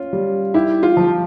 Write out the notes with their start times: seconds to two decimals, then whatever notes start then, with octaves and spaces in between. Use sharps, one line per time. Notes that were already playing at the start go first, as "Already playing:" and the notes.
Already playing: C#4 F4
0.13 G3
0.54 E4 G4
0.83 F4
0.97 F3